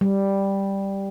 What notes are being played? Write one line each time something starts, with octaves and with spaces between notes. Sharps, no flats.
G3